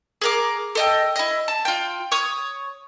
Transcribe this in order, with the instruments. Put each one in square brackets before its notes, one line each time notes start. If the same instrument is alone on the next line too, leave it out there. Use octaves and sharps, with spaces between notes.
[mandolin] G#4 A#4 D6
A4 D#5 G5
E4 D#5
A5
F4 G5
C#5 C#6 D#6